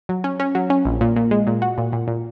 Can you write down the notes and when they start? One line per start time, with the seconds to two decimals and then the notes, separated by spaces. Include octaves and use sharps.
0.09 F#3
0.24 C#4
0.40 C#4
0.55 F#3
0.70 C#4
0.85 A#1
1.01 A#2
1.16 A#2
1.31 G#3
1.47 A#2
1.62 F#4
1.78 A#2
1.93 A#2
2.08 A#2